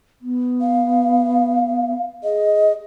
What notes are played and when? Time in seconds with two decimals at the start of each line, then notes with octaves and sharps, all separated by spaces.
0.22 B3
0.61 F5
2.23 G#4 D#5